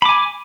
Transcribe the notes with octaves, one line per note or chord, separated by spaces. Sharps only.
G#5 B5 D6